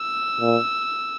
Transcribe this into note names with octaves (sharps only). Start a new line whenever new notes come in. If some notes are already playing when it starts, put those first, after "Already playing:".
Already playing: E6
A#2